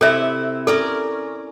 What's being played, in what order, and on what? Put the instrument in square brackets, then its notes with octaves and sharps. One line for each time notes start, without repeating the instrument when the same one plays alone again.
[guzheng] C3 E4 [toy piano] A4 C5 E5
[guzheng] C#4 A#4 D5 [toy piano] A4